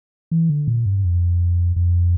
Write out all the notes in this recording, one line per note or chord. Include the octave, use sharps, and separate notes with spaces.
E3
D3
A#2
G2
F2
F2